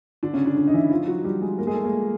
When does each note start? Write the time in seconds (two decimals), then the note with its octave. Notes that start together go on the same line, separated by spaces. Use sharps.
0.23 D3 D4
0.34 C#3 C#4
0.45 D3 D4
0.57 D3 D4
0.68 D#4
0.74 E3 E4
0.91 F3 F4
1.08 F#3 F#4
1.24 G3 G4
1.41 G#3 G#4
1.58 A#3 A#4
1.67 G#3 G#4
1.75 A3 A4
1.84 A#3 A#4